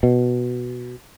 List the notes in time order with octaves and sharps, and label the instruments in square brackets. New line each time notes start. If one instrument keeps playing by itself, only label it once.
[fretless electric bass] B2